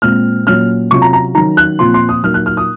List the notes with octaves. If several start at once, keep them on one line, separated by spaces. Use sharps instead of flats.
A#2 G#3 C4 F6
A#2 F#3 C#4 F6
C3 F#3 C#4 F4 C#6
A#5
A#5
D#3 F#3 C#4 A#5
F#6
A#2 F3 C4 F4 C6
C6
D#6
A#2 F#3 A#3 D#4 F6
F#6
F6
D#6